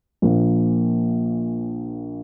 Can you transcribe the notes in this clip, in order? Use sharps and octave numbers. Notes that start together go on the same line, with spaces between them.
A#1 A#2 F3 A#3